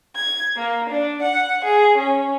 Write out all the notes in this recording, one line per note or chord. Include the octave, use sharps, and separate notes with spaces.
G#6
A#3
D4
F#5
G#4
C#4